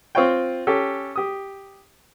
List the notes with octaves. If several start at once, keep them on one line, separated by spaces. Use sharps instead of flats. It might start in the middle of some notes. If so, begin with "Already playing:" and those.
C4 F4 C#5 G5
C#4 G4 A4
G4 D#6